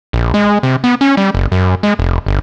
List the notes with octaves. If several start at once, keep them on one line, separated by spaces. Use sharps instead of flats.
A#1
G#3
C3
B3
C#4
G3
F#1
F#2
G#3
F1
G1